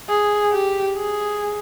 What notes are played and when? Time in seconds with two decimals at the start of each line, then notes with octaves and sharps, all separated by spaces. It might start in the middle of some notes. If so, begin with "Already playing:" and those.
0.09 G#4
0.53 G4
0.97 G#4